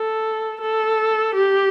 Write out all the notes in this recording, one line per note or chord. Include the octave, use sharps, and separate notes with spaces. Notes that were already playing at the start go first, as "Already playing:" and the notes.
Already playing: A4
A4
G4